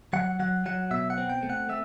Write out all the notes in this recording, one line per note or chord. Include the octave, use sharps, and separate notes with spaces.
F#3 F#5
F#3 F#5
F#3 F#5
B2 E5
F#5
C4
G5
A3
F#5
A3 E5